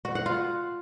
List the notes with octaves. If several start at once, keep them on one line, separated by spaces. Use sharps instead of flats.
F#4
F#5
F4